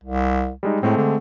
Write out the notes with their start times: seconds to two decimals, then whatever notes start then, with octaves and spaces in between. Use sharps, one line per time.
0.04 C2
0.63 G3 G#3 D#4
0.83 A2 G#3 A3 C4
0.97 D3